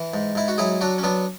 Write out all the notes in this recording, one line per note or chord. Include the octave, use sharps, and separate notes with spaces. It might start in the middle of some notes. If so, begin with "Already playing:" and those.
Already playing: E3
G#2
G#2 E4
F#4
F#3 E4 G#4
F#3 D4 F#4
C#4
F#3 B3 D4